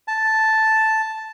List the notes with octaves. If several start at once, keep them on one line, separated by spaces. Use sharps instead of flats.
A5